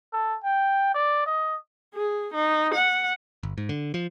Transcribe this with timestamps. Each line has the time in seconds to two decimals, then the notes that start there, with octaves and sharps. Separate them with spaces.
0.13 A4
0.43 G5
0.94 D5
1.26 D#5
1.94 G#4
2.34 D#4
2.74 F#5
3.43 G1
3.58 G#2
3.69 D3
3.94 F3